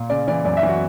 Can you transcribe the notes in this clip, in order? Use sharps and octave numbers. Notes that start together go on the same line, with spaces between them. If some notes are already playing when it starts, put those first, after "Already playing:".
Already playing: A#2
C#3 D5
E3 D5
F#2 D5
E5
E3
F#4